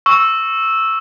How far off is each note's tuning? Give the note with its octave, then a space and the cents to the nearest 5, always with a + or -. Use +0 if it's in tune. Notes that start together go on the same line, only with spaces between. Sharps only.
C#6 +0 E6 +0